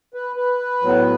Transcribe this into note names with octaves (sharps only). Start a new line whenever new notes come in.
B4
B4
A2 F#3 B3